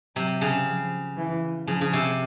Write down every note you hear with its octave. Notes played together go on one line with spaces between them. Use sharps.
C3 F#3
C#3
F3
E3
C#3 F3
C#3
C3